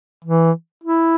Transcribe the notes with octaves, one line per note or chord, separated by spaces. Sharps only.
E3
E4